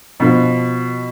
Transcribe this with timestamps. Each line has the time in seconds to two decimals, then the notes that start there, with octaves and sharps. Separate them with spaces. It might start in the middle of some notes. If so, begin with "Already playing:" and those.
0.20 B2 F3